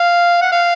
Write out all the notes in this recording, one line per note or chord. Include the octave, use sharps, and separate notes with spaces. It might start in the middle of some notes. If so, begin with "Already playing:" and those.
Already playing: F5
F#5
F5